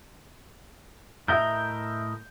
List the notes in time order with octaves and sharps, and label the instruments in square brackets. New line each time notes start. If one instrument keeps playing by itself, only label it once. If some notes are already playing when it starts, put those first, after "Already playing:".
[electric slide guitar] A2 A#4 D#5 [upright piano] E5 G6